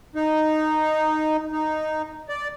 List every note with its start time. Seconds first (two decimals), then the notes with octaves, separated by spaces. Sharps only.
0.15 D#4
1.52 D#4
2.29 D5